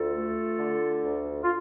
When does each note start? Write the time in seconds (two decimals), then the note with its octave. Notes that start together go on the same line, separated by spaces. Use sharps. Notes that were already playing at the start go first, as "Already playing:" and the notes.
Already playing: D2 F4 A4
0.13 A3
0.59 D3
1.05 D2
1.43 F4